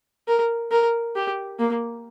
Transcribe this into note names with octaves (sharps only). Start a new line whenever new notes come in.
A#4
A#4
G4
A#3